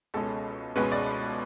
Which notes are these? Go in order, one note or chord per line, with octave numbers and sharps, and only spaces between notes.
C#2 B2 G#3 C#4 A4
C#2 B2 G#3 C#4 B4
D5